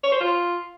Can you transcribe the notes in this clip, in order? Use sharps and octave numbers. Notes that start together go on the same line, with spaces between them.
C#5
C5
F4